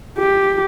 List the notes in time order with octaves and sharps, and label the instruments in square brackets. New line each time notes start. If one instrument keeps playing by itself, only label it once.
[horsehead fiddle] G4